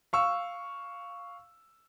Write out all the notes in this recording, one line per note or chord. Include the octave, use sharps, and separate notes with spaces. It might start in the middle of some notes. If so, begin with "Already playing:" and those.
F5 C#6 E6